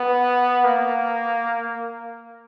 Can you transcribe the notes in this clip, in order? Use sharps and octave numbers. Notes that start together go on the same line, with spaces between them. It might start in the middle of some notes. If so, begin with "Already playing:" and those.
Already playing: B3
A#3